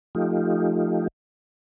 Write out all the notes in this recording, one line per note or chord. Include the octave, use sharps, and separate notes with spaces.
F3 A3 D#4 F4 G4